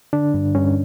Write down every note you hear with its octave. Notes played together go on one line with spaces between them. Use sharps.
D3 D4
G2
G2 C#4